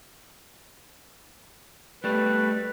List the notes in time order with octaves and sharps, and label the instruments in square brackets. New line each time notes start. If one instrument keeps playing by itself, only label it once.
[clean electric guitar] G3 A3 [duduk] B4